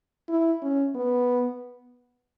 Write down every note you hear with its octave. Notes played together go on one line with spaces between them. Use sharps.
E4
C#4
B3